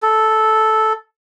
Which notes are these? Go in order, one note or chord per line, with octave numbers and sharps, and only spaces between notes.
A4